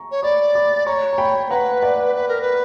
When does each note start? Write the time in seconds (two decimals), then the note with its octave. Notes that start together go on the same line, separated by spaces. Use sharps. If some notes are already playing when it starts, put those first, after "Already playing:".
Already playing: A#5 C#6
0.11 C#5
0.22 D5 B5 D6
0.55 B5 D6
0.87 C#5 A#5 C#6
1.13 A#5
1.18 G5 B5
1.46 C#5
1.50 B4 F#5 A#5
1.83 D5 F#5
2.15 B4
2.28 A#4
2.41 B4